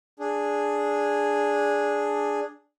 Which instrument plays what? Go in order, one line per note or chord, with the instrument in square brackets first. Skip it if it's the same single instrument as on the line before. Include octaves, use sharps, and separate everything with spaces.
[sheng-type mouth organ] D4 G#4